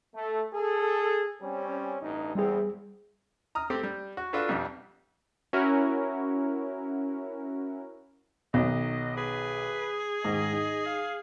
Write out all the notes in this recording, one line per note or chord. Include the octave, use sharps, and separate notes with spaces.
A3
G#4 A4
G3 C4 C#4
A1 G2 D#4
E2 G3 C4 G#4
A#5 D#6 F6
A3 C4 G4
G3
F#4
D4 F4 F#4 A4 B4
B1 F2 G3 B3
C#4 E4 F#4 A#4
B1 D#3 F#3 D#5
G#4 B4
G#2 D#3 D#5
D#4
F5